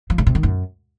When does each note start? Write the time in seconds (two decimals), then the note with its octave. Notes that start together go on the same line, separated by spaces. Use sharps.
0.10 F3
0.18 C#3
0.27 C3
0.35 D#3
0.43 F#2